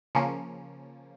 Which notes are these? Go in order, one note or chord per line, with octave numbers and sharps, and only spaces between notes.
C#3 F3 A#3 C#4